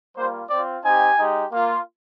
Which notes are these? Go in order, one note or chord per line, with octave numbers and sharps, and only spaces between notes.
G3 A#3 F4 C5
C4 F4 D5
C4 D#4 G4 G#5
G#3 D#4 G4
A#3 F4